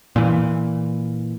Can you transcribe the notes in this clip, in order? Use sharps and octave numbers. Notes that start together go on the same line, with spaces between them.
A#2 E3